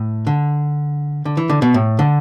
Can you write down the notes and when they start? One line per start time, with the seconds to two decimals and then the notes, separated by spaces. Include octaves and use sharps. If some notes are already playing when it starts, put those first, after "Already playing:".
Already playing: A2
0.27 D3
1.25 D3
1.37 E3
1.50 D3
1.62 B2
1.74 A2
1.99 D3